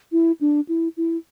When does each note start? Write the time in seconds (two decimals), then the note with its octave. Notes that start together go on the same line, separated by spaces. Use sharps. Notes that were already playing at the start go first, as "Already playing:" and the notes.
0.12 E4
0.41 D4
0.69 E4
0.97 E4